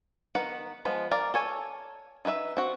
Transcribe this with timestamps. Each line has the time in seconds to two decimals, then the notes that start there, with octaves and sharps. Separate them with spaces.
0.35 D#3 B3 B4 F#5 A#5
0.85 F3 G#3 B3 B4
1.11 A#4 D5 F5
1.34 A4 C#5 G#5
2.25 D#4 E4 B4 E5 B5
2.57 C4 F#4